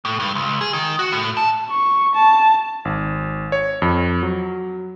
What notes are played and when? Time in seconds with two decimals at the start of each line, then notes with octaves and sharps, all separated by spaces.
0.05 A2
0.20 G2
0.35 C#2
0.61 G#4
0.73 D#3
0.99 F#4
1.12 A2
1.37 A5
1.70 C#6
2.15 A5
2.85 G#1
3.52 C#5
3.82 F2
4.23 F#3